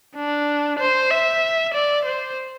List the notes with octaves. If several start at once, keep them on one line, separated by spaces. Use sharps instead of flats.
D4
C5
E5
D5
C5